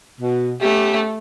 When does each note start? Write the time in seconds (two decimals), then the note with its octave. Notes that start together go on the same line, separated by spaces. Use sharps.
0.20 B2
0.61 A3 B3 C#4 G4